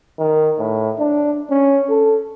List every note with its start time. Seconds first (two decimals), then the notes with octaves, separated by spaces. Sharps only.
0.19 D#3
0.59 A2
0.99 D4
1.50 C#4
1.89 A4